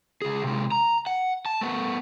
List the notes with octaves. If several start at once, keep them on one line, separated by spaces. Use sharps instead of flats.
C#2 G#4
C3 G#3
A#5
F#5
A5
A3 B3